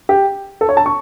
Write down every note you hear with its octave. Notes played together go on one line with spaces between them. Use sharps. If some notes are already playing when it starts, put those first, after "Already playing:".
G4
A4
C#5
A5
C#6